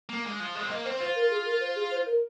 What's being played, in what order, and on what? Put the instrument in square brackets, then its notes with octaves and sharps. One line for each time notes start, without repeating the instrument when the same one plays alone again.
[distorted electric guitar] A#3
G#3
F3
G#3
C4
[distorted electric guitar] A#3 [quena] D#5
[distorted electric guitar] C4 [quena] C5
[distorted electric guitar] F4 [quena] C5
[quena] A#4
G#4
A#4
C5
G#4
C5
A#4